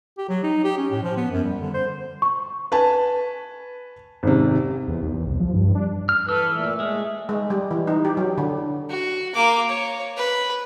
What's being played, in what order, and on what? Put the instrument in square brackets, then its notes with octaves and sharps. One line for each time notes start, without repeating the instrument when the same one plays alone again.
[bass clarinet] G4
F#3
D#4
G4
C#4
A2
F3
B3
F#2
G3
D3
C5
[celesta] C#6
[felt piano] B4 G#5 A5
G#1 C3
[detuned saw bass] E2
D#2
E2
C2
F3
G2
D4
[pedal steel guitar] F6
[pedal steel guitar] E3 E6 F6 [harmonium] A4 B4
[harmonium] A#2 A3
[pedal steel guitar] G#3 [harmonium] A3
[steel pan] G#3
G3
E3
D#4
G4
F#3
D3
[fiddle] F#4
A#3 D6
C#5
B4